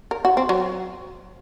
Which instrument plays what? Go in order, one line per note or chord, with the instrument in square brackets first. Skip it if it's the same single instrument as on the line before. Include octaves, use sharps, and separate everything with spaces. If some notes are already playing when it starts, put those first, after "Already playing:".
[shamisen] A#4
F#4
C4
F#3